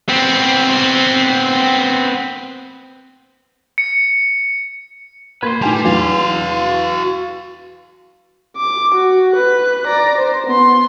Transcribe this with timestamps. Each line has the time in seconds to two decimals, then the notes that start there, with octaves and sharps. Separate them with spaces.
0.09 B3 C4
3.78 C#7
5.43 A#3 B4 B5 C6 G#6
5.62 A2 G3 G#5 A5
5.85 E2 F#3 F#4 F5
8.57 D6
8.95 F#4
9.34 B4 F#6
9.87 D5 A#5
10.18 C5
10.47 B3 C6